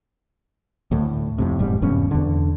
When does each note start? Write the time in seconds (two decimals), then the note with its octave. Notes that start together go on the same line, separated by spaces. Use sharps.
0.91 D2 A2
1.38 F2 A2 C3
1.59 E1 G#2 G3
1.82 D#1 G2 B2 C#4
2.11 E2 D3